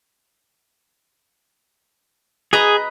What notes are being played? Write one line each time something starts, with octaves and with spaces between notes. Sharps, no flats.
G#4 B4 D#5 A#5